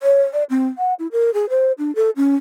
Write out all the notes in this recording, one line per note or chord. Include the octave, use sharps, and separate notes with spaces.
C#5
D5
C4
F#5
E4
A#4
G#4
C5
D4
A4
C#4